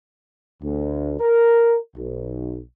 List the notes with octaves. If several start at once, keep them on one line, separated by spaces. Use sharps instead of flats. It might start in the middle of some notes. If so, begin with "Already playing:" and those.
D2
A#4
B1